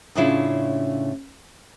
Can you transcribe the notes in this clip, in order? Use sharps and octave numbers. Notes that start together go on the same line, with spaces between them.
A2 C#3 C#4 D4 E4 F4